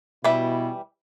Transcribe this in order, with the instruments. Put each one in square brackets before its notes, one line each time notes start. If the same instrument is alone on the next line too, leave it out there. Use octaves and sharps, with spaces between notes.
[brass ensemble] B2 E4 [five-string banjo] E3 G3 E5